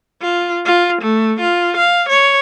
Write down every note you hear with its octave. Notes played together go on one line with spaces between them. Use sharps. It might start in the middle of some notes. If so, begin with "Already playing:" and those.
F4
F4
A3
F4
F5
C#5